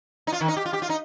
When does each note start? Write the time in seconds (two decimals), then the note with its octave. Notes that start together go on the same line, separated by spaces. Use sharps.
0.27 D#4
0.32 F4
0.40 D#3
0.48 D#4
0.57 G4
0.66 F4
0.73 G4
0.82 F4
0.89 D#4